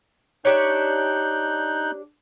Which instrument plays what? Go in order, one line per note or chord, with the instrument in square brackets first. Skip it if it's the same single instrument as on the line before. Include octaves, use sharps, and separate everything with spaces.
[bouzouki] D4 G4 C#5 [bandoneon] D#4 F#6 G6